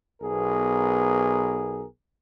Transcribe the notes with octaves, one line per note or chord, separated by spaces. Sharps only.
B1 B3 G#4 A#4